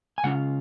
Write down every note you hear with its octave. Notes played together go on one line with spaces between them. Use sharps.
G#5
C#3 G#3 C#4 F4 F#5